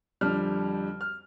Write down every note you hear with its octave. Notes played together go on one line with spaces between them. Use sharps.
F2 D3 G3 F6
F6